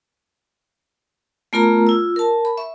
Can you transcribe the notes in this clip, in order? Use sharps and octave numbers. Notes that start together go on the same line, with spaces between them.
A3 B3 F4 A#4 A#5
F4 E6
A#4 A5
B5
E5 C#6